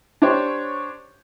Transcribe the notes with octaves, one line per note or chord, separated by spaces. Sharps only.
D4 G4 C5 C#5